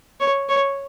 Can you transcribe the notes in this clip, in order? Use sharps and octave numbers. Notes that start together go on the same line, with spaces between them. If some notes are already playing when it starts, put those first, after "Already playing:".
C#5
C#5